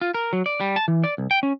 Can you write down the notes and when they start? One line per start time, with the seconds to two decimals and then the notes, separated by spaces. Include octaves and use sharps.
0.01 F4
0.14 A#4
0.33 F#3
0.46 D5
0.60 G3
0.76 A5
0.88 E3
1.04 D5
1.18 C2
1.31 G5
1.43 C#4